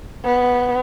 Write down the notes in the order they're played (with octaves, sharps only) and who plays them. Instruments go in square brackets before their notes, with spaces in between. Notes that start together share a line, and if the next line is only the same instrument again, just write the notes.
[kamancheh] B3